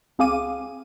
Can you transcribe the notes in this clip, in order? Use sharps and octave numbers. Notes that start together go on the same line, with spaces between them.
C#2 C4 G#4 F5 D6 D#7